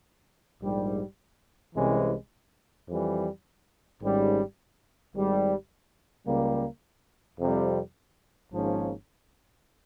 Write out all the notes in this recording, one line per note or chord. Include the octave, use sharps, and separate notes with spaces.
A#1 G#2 G3
C2 C3 E3 G#3 C#4
F2 E3 G3
G#1 G#2 G3 C#4
G#1 G#2 G3
C#2 C#3 G3 A#3
F2 C3 G3
G#1 G#2 F3 A#3 C#4